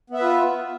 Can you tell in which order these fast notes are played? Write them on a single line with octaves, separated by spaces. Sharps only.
B3 E5 B4 F4